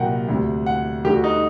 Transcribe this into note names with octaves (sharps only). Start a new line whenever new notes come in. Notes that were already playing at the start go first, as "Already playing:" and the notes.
Already playing: C2 A#2 F#3 A#4 F#5 G5
D2 C3 G3
F#5
D2 D3 G3 G4
F#4
D#4